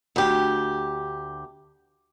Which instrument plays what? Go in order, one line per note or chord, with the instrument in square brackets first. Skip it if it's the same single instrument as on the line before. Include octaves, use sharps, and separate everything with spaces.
[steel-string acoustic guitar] D2 G4